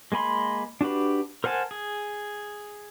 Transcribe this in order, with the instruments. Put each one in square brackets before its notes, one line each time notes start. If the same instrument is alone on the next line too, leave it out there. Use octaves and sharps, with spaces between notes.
[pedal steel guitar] G#3 A#3 G#5 B5 C6
D4 F#4 G4 B4
A#4 C5 F#5 G#5 A5
G#4